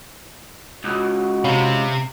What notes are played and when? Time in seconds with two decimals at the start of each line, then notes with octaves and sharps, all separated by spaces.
0.84 C#2 F#4
1.44 C3 C#5 F5 B5